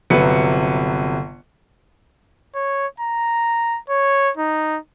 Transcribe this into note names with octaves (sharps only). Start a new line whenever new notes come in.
G1 C3 F#3 B4 C#7
C#5
A#5
C#5
D#4